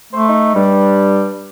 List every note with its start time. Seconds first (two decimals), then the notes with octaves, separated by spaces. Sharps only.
0.13 A3 C5
0.28 D#4
0.55 G2 G3